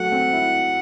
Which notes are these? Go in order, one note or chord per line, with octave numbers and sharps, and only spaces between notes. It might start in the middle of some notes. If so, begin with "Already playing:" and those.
Already playing: F#3 A3 F#5
C4
E4